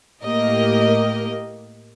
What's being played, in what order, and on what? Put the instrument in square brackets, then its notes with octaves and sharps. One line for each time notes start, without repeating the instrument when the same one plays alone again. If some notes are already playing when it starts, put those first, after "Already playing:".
[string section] A2 A#3 G4 A#4 D#5